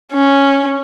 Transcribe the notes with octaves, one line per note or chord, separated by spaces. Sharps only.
C#4